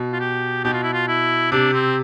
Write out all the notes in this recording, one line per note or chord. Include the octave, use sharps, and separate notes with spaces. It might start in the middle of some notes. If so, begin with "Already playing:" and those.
Already playing: B2
F4
G4
B2 G4
F4
E4
F4
E4
C3 D4
C4